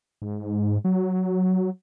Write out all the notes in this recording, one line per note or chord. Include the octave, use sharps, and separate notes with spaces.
G#2
F#3